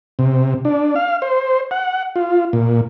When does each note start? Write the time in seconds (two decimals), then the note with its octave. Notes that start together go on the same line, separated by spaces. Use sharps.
0.19 C3
0.65 D4
0.96 F5
1.22 C5
1.71 F#5
2.16 F4
2.53 A#2